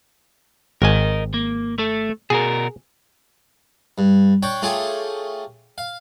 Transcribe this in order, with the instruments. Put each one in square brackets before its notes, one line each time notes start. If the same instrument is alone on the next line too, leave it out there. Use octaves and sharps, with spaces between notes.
[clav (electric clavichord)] G#1 G#5 [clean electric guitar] A#4 D#5
[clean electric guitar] A#3
A3 A4
[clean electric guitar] B2 F#4 A#4 [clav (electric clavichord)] G#4
[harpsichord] G2
D4 C#5 G5
A3 F4 G4 G#4 C#5
F5